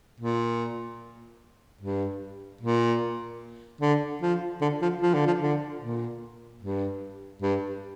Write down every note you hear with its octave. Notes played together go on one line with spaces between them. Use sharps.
A#2
G2
A#2
D3
F3
D3
F3
F3
D3
F3
D3
A#2
G2
G2